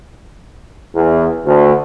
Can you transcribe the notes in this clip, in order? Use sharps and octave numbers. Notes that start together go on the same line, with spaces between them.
E2
D2